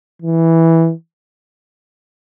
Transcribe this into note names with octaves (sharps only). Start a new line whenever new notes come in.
E3